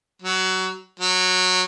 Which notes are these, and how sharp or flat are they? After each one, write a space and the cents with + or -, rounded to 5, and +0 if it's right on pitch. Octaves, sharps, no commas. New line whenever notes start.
F#3 +20
F#3 -10